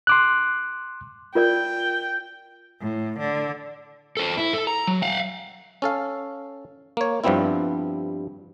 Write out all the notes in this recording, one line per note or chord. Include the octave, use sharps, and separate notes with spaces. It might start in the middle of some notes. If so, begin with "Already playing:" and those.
C6 D6 F#6
F4 A#4 D5 G5
A2
D3
A4 C5
E4
A4
A#5
F#3
F5 F#5
C#4 A4 F5
A#3 C#5
G2 F3 G3 B3 C4 E4